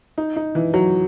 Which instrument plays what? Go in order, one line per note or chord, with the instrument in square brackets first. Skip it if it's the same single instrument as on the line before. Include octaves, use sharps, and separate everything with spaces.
[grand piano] D#4
D#4
E3
F#3